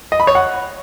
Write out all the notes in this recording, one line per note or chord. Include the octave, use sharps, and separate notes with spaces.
D#5
B5
C#5
F#5